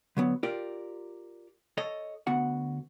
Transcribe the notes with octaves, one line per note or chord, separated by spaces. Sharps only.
D3 F#3 B3
F4 G4 A#4 D5
A4 C#5 D#5
D2 B3 F#4 F#5